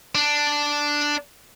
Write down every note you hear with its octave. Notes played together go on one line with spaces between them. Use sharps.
D4